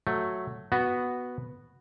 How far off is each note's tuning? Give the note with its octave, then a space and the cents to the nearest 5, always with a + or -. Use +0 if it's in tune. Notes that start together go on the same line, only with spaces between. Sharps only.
F#3 +0 A3 +0
B3 +0 F#4 +0